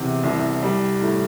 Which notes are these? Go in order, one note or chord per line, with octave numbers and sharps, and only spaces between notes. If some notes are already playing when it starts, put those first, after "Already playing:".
Already playing: E2 C3
C2
G3
A2